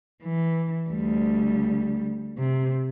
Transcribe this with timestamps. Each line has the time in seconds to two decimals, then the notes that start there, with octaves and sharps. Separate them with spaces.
0.23 E3
0.89 D2 G3
2.38 C3